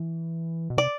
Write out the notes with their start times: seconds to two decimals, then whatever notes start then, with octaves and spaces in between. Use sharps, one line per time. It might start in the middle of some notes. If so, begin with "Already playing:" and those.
Already playing: E3
0.70 B2
0.77 C3 D5